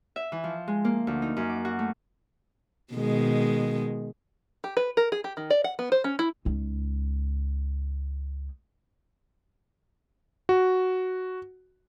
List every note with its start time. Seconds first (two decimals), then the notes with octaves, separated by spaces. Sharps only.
0.16 E5
0.32 E3
0.44 F3
0.68 G#3
0.85 A#3
1.07 D2
1.22 D#4
1.37 F#2
1.50 D6
1.65 F#4
1.79 A3
2.93 B2 D#3 G#3
4.64 G4
4.77 B4
4.97 A#4
5.12 G#4
5.24 G4
5.37 D#3
5.50 D5
5.64 F#5
5.79 B3
5.92 C5
6.04 C#4
6.19 E4
6.45 C#2 D#4
10.49 F#4